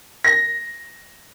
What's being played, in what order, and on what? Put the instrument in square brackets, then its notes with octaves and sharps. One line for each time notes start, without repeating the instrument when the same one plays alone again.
[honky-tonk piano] A#6